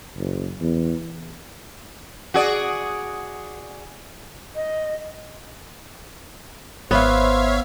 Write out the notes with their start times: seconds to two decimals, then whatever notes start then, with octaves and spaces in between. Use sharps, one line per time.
0.17 F#1
0.60 E2
2.34 F#4 G#4 D5
4.55 D#5
6.91 G#1 B3 C5 C#5 E5 F5